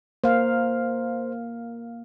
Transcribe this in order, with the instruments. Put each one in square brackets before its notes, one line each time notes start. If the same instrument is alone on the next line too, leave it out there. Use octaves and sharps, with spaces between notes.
[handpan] A#3 F5 [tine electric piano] C5